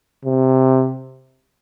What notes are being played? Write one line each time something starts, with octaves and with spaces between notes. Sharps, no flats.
C3